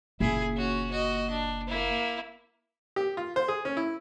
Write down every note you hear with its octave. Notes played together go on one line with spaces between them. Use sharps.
F#1 A#2 E4 G#4
C#4 F#4
F#4 D#5
D4
A#3 E4
G4
F4
C5
G#4
C#4
E4